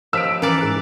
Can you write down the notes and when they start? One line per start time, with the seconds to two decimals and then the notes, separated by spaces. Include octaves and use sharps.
0.13 D#2 F3 E6 B6 D7
0.42 E3 C#4 A#4 B4 D5
0.61 G#2 G#4 F#6